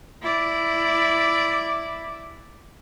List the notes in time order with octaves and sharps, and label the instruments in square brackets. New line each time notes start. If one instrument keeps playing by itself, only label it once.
[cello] E4 D5